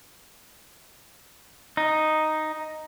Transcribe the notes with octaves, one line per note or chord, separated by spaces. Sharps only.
D#4